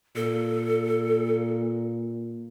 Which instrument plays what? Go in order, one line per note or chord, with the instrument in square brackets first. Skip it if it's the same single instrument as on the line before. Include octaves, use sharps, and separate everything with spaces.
[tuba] A#2 [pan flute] A4